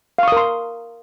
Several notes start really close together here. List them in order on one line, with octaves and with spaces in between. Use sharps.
F5 C#6 D#6 A#4 C6